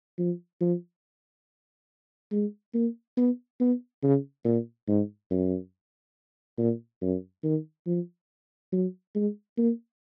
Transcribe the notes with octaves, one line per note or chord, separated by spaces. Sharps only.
F3
F3
G#3
A#3
B3
B3
C#3
A#2
G#2
F#2
A#2
F#2
D#3
F3
F#3
G#3
A#3